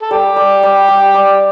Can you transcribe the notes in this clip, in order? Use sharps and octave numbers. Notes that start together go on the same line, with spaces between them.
A4
G3 G4
G3
G3
G3
G3